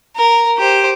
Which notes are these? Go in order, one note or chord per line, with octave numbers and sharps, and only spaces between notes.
A#4
G4 C5